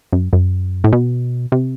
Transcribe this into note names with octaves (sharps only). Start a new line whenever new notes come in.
F#2
F#2
A2
B2
C3